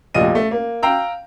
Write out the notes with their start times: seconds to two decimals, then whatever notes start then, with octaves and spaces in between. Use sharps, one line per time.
0.14 F1 A#1 A#2 D#5 D#7
0.35 A3
0.51 A#3
0.83 F5 G5 A#5 E6